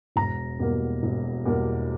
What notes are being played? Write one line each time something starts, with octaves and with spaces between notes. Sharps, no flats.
E1 A#5
E2 B2 G3 A#3
E1
E2 B2 G3 A#3